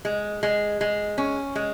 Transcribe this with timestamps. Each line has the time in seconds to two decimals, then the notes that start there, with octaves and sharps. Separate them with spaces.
0.05 G#3
0.43 G#3
0.81 G#3
1.18 C#4
1.55 G#3